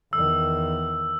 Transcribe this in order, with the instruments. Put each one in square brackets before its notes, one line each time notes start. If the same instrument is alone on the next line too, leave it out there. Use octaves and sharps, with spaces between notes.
[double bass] E2 D#3 [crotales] E6